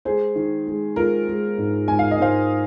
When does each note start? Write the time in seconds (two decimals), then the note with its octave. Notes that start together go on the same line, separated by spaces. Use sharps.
0.05 G#3 G#4 C5
0.36 D#3
0.67 G#3
0.96 G#3 F4 A#4
1.28 G#3
1.58 G#2
1.88 G#2 G#5
1.99 F5
2.11 D#5
2.18 G#2 C5 F5